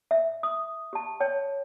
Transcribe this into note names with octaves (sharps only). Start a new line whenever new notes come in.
E5
D#6
G4 A5
C#5 G5 A5